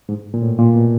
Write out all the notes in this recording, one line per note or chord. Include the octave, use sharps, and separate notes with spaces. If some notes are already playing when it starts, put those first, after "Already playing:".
G#2
A#2
A2
A#2
B2